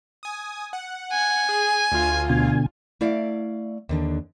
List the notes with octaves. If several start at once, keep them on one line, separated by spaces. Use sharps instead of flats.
G#5 D#6
F#5
G#5
G#4
D2 F4
B2 D3 G#5
A3 E4 D5 F5
D#2 D3 D4